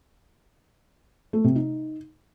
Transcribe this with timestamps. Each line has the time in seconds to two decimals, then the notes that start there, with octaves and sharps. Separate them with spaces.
1.33 A3
1.44 C3
1.56 D#4